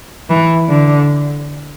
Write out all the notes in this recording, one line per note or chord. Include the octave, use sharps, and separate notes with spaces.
E3
D3